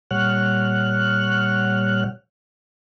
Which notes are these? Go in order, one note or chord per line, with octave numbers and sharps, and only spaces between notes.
A#2 G3 C#5 F#5 F6 F#6